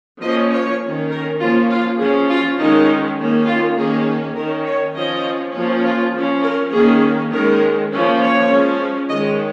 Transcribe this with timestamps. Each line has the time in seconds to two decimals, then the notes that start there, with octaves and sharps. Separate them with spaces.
0.22 F3 A#3 C#4 D#5
0.52 C#5
0.81 D#3 C#4
1.11 A#4
1.40 F3 A#3 C#4 F4
1.69 F4
1.99 F3 C#4 G#4
2.29 F4
2.58 D#3 G#3 C#4 D#4
3.18 D#3 A#3 C#4
3.47 F4
3.76 D#3 A#3 C#4 G#4
4.36 D#3 C#4 A#4
4.66 C#5
4.95 F3 C#4 D#5
5.54 F3 A#3 C#4
5.83 F4
6.13 F3 C#4
6.43 A#4
6.72 D#3 A#3 C#4 G#4
7.32 D#3 G#3 C#4 A#4
7.91 F3 A#3 C#4
8.20 C#5
8.50 F3 G#3 C#4
9.09 D#3 G#3 C#4 D#5